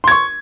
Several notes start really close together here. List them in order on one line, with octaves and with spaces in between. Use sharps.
C6 G#6 C#6